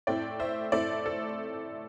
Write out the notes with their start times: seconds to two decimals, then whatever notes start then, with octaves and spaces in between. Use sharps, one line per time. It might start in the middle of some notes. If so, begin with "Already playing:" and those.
0.07 A2 A3 C4 E4 D5 G5
0.39 C5 E5
0.72 A2 A3 C4 E4 A4 D5
1.06 A4